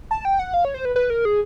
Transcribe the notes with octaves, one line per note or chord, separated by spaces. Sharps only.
A5
G5
F#5
F5
C#5
C5
B4
B4
A#4
G#4